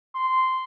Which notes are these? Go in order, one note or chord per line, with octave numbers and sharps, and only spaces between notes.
C6